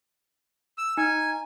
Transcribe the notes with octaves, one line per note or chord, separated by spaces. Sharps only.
E6
D#4 G#5